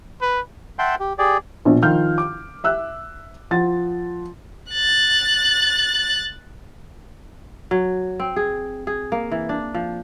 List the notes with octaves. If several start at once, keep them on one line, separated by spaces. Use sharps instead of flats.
B4
E5 F#5 G5 A5 C6
G4
G4 G#4 D5
A#1 B2 D4
D#3 F3 F5 F6 G6
D6
E5 E6 F#6
F3 F#5 A6
F#6 A6
F#3
C4
G#4
G#4
A#3
E3
D4
F3